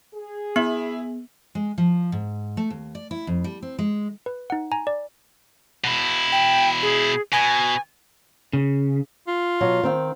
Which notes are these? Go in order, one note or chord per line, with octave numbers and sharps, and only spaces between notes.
G#4
B3 E4 F#7
G#3
F3
G#2
A3
D#2
D5
E4
F2
G3
C4
G#3
B4
D#4 F#5
G#5 A#5
D5
B2 E4
G5
G#4
B2 G#5
C#3
F4
B2 F#3 F#5
D#3 C4 F5